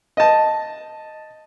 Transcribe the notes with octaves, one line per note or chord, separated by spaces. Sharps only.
D#5 A5